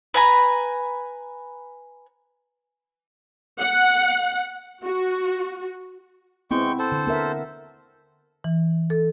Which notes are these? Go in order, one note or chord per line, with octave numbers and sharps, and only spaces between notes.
B4 G#5 A#5
F#5
F#4
G#3 B3 C4 E4 G5 C#6
A4 C5
D3
B3 A#4 E5
E3
A4